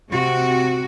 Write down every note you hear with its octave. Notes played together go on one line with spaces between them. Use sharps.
C3 F#4